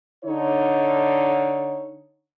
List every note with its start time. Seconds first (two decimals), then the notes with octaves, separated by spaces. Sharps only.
0.24 D3 D#4 C#5